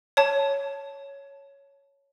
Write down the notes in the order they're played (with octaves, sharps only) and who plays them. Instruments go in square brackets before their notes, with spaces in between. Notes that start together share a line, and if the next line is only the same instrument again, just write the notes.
[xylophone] C#5 A5